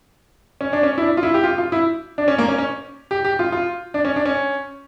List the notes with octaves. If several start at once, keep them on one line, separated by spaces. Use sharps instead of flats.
C#4
D4
C#4
E4
D4
F4
E4
G4
F4
F4
E4
D4
C#4
A#3
C#4
C#4
G4
G4
F4
F4
D4
C#4
D4
C#4